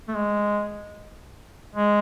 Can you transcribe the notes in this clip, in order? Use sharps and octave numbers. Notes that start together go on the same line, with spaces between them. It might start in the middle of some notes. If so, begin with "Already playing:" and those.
A3
G#3
G#3